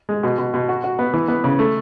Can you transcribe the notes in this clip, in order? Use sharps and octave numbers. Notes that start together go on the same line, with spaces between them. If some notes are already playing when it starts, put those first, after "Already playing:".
G#3
B2
B2
B2
F#4
F#4
B3
E3
B3
C#3
A3